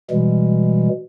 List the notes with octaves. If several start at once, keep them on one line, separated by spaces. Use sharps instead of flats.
B2 E3 G3 G#3